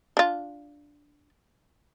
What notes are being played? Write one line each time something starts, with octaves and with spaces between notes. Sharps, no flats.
D4 F4